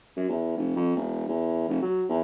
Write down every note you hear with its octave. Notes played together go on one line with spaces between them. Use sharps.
F#2
E2
F1
F2
E1
E2
F1
F#3
E2